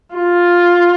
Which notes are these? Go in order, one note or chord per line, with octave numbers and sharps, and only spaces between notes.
F4